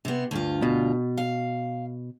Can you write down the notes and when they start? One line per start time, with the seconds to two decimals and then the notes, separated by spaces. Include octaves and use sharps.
0.05 C3 B3
0.31 D2 G2 F4
0.62 B2
1.17 F5